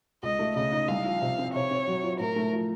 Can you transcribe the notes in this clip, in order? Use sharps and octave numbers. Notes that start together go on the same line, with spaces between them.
C#2 D#5
A3
C#3 D#5
D#4
C2 F5
F3
C3
C4
C3 C#5
C4
F#3
F4
A2 A#4
A3
F3